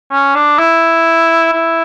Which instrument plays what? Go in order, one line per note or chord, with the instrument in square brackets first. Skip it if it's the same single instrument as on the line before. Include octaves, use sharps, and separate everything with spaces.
[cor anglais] C#4
D4
E4
E4